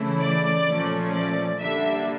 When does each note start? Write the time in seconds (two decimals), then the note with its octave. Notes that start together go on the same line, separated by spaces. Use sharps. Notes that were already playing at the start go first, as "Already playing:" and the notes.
Already playing: C#3 E3 A3 E4
0.19 D5
0.66 A#2 F3 A3 C#4
1.13 D5
1.60 D3 G3 A#3 D4 E5